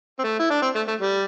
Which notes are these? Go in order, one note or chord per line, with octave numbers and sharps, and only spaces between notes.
C4
A3
E4
D4
C4
A3
A3
G3